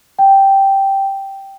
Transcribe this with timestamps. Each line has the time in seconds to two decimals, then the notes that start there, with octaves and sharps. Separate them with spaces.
0.19 G5